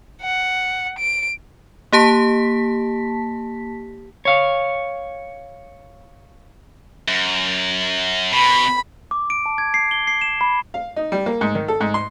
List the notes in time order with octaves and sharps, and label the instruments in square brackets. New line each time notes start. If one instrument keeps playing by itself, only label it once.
[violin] F#5
D7
[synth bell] A#3 G4 A5 B6
[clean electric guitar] C#5 F5
[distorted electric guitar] F#2
[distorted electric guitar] B2 [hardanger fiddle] B5
[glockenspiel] D6
D7
A5
G#6
C7
G7
C7
E7
B5
[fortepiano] F5
D#4
G3
A#3
G#2
D#3
A4
G#2
C6